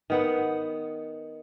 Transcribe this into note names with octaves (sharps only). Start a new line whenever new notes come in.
D#3 B3 F#5